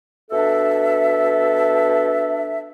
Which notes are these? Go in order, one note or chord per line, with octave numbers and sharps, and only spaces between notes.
B2 D4 A4 E5